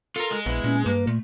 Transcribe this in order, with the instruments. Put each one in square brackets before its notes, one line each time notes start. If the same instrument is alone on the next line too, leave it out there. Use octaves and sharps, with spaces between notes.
[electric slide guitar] F4 [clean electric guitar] A4 A#4
[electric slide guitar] G#3
[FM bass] A#1 [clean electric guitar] B3 E4
[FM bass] A#2 [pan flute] C#4
[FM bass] G2 [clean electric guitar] A#3 [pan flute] B4
[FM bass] A#2 [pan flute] A3